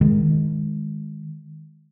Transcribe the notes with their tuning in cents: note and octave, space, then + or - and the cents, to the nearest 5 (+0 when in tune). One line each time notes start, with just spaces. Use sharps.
D#3 +5 G#3 +0